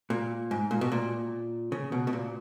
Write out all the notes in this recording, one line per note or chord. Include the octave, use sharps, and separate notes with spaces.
A#2
G#2
A#2
B2
A#2
C#3
B2
B2
A#2